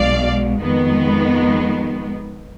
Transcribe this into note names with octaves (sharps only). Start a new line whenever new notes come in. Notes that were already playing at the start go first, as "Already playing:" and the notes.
Already playing: B1 B2 G#3 D5 F5
F2 D#3 G#3 B3